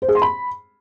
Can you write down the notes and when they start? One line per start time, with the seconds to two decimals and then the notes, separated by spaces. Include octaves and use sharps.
0.02 C5
0.09 G#4
0.15 C6
0.22 B5